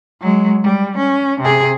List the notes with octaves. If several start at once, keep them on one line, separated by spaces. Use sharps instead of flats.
F#3 G#3
G3
C#4
C3 G#4